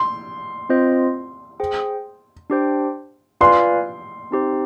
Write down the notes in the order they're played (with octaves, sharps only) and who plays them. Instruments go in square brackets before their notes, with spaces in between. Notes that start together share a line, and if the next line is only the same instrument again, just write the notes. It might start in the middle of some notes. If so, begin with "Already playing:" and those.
Already playing: [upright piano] C6
[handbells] C4 F4 C5 D#5
G#4 C5 G5
D4 G4 C5 G5
[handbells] F4 B4 D5 F5 G#5 [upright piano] C6
[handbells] C4 D#4 G4 C5